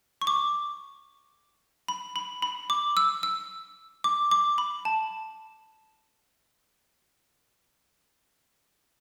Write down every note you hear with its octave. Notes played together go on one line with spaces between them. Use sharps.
C#6
D6
B5
B5
B5
D6
E6
E6
D6
D6
B5
A5